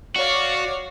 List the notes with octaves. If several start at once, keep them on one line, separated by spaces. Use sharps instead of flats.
F#4 C#5 D5 F5